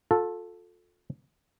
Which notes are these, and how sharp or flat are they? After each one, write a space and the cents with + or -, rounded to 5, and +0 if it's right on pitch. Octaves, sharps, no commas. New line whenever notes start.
F4 +35 A4 +0